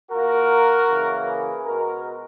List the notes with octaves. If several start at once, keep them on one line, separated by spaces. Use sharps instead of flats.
A#2 A#3 F#4 A#4
C#3 E3 A#3
G#4 B4
B2 G#3 B3 F#4 A#4